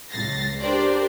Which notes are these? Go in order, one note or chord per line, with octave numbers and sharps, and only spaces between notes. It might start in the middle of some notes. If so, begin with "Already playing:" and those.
C#2 A6 A#6 C7
D4 G4 A#4 C5 D5